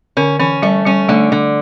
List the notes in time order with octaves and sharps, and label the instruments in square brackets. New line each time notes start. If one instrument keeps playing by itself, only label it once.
[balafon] D3 [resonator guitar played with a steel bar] C#4
[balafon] E3 [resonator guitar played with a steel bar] C#4
[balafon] G3 [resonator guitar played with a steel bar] A3
[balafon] G3 [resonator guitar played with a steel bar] C#4
[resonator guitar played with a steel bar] D3 [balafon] A3
[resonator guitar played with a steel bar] D3